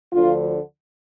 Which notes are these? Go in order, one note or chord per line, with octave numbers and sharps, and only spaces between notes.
D2 D3 F3 F4